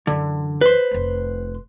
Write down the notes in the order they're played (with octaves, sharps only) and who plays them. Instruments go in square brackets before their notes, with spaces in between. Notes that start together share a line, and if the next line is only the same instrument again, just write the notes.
[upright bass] F#2 E3 [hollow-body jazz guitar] D3
[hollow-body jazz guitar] B4 C5
[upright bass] F1 A3